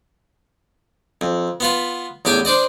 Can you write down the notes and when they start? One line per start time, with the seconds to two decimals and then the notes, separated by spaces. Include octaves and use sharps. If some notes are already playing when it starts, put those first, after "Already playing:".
1.21 F2
1.60 B3 F4 B4
2.25 A1 E2 G4 G5 G#5
2.45 D4 C5 D5 D#5